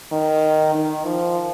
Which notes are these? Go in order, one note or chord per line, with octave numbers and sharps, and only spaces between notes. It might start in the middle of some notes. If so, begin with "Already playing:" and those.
D#3
D#3
F3